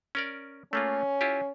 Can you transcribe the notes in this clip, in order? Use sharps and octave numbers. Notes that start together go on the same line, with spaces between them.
C#4 A#4 D5
A3 A#3 C#4 F4
E4 F4 G4